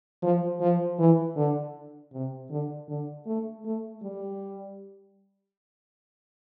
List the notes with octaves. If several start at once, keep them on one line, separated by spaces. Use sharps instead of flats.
F3
F3
E3
D3
C3
D3
D3
A3
A3
G3